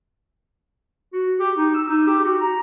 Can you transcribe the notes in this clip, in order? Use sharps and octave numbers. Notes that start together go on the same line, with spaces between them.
F#4
G4
D#4
E6
D#4
G4
F#4
A#5